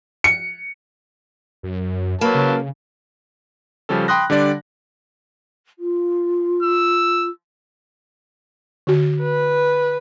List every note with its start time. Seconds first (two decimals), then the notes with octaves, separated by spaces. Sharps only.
0.24 C#7
1.63 F#2
2.21 F#3 A#3 B4 A5
2.35 C#3
3.89 C#3 F3 G3 C#4 A4
4.08 G5 B5 C6 D#6 F#6 A#6
4.30 D3 G3 D4 D5
5.79 F4
6.63 E6
8.87 D3 F#4
9.22 B4